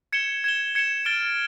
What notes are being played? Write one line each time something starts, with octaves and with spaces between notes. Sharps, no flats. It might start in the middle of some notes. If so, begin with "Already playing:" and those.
G#6 C#7 E7 G7
G#6 C#7 E7 G7
G#6 C#7 E7 G7
F6 A6 D7 G7